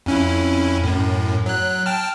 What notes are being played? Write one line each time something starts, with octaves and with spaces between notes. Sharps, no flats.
F2 C#4 E4
F#2 A2
F#3 F#6
G5 A5 F6